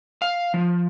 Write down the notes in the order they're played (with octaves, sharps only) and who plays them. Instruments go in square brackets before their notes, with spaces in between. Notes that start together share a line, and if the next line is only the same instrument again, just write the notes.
[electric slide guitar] F5
F3